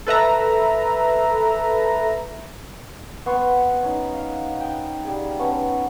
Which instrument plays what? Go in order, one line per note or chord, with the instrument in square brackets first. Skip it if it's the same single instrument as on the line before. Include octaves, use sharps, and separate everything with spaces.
[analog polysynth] A4 B4 E5 A#5
[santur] B3 C6 C#6
C#4 D#4
F5
G5
G3 G#4
B3 C#4 C#5 A5